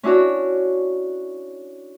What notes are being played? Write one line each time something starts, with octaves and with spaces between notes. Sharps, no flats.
C#4 D4 E4 F#4 C#5